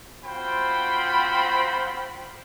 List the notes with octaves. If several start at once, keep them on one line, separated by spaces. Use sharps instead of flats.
C4 F4 F#4 C5 G5 B5